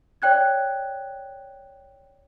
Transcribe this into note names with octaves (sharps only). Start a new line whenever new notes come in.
C#5 D5 G5 F#6 G#6